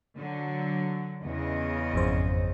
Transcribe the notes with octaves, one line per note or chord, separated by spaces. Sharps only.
D3 F#3
E2 C#3 D#5
G#1 F2 C5